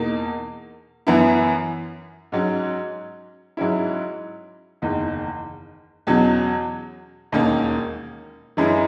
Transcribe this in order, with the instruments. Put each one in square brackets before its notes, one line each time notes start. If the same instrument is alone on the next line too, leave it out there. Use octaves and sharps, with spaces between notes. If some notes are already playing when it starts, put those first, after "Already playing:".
Already playing: [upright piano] E2 B2 A#3 D#4
F#2 E3 B3 E4
G#2 F#3 C#4
G#2 F#3 C#4 E4
F#1 E2 D#3
E2 B2 F#3 C#4
E1 D#2 D#3 A#3 C#4
F#2 E3 G#3 C#4 E4